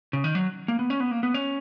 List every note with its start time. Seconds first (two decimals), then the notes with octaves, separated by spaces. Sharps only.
0.13 C#3
0.24 D#3
0.35 F#3
0.68 A#3
0.79 B3
0.90 C#4
1.00 B3
1.11 A#3
1.23 B3
1.34 C#4